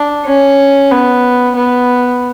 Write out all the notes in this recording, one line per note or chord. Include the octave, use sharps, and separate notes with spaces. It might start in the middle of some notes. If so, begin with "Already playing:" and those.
Already playing: D4
C#4
B3
B3